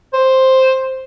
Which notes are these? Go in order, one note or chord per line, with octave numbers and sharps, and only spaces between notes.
C5